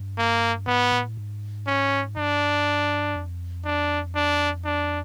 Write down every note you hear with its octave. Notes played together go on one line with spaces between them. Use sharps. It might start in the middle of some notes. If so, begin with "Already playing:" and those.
Already playing: G2
A#3
G#2 B3
A2
G#2
C#4
G2 D4
F2
D4
D4
D4